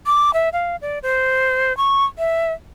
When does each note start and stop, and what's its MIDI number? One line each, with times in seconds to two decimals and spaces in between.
0.06 0.31 86
0.34 0.49 76
0.53 0.76 77
0.82 0.99 74
1.03 1.76 72
1.77 2.05 85
2.18 2.52 76